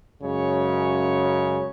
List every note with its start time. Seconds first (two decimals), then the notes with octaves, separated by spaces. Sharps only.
0.22 F#2 C#3 G#3 C#5